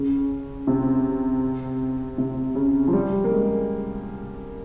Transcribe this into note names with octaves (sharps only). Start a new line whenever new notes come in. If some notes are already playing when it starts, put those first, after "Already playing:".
Already playing: C#3
C3
C3
C#3
F3
G3
A#3
G#3